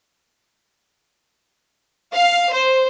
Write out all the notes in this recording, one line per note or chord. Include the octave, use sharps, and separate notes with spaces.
F5
C5